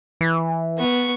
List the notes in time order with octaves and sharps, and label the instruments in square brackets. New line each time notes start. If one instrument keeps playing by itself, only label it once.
[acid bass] E3
[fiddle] B3 C#6